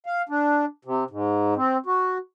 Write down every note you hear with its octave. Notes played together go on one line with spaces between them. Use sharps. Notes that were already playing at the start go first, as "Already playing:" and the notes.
F5
D4
C3
G#2
C4
F#4